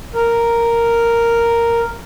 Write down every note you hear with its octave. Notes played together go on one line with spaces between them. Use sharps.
A#4